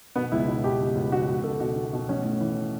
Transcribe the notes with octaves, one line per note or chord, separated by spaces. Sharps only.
B2 B3
C#2 E4
B2
B2 G4
C#2
C#2
C#2 F#4
B2 F#4
B2 A4
B2 F#4
B2
B2
A1 C#4
A2
E3